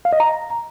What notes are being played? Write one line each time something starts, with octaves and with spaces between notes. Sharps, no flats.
F5
D#5
A#5